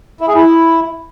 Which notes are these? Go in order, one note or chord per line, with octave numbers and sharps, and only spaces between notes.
E4
G#4
E4